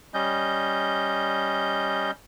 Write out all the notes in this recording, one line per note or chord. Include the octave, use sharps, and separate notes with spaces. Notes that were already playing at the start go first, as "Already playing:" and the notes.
G3 C#4 D#5 G6